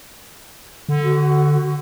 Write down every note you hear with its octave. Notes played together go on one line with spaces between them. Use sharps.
D3
F#4